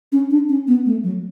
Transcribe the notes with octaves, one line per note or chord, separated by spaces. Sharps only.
C#4
D4
C#4
B3
A3
F#3